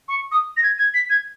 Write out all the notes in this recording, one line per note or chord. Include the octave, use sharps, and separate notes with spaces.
C#6
D#6
A#6
G#6
G#6
B6
G#6